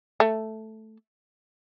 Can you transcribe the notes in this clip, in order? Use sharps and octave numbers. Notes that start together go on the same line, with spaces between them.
A3